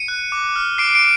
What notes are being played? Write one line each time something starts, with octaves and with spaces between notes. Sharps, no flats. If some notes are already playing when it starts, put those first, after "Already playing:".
Already playing: C#7 D#7
F#6
D6
F6
D6 C7 D7
C7 D7